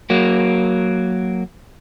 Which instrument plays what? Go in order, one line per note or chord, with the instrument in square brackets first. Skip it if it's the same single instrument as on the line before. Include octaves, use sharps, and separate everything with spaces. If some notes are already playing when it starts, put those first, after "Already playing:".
[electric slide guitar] F#3 A#3